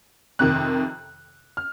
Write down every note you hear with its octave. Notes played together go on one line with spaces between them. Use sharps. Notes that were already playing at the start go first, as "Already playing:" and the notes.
F2 C3 D#3 F#6
F6